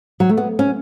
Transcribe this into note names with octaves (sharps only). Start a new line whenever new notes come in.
F#3
A3
B3
C#4